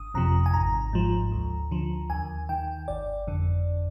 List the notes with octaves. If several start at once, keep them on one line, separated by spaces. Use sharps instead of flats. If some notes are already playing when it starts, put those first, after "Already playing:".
Already playing: G1 D#6
F2 C3 F3 A#5
G#5
G#1 A#5
G#2 F3
D2
D3 F3
D#2 G#5
D#3 G5
G1 D5
F2 D3